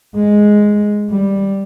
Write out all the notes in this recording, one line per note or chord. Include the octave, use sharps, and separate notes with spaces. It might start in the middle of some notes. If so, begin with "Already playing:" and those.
G#3
G3